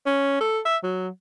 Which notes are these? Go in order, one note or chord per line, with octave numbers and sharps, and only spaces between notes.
C#4
A4
E5
F#3